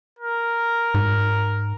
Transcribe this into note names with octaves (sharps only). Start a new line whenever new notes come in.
A#4
G#2